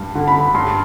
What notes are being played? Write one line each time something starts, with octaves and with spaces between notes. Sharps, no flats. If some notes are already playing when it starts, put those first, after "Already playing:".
Already playing: G2
D3
B5
G2 C6